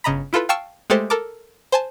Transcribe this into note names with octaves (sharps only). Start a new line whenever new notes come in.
G1 C#3 D#5 A#5 B5
E4 F4 A4 B4
F5 G5 A5 C#6 E6 F6
G#3 A3 G4 A4 C5
A4 A#4 A5 D6
C5 G#5 A5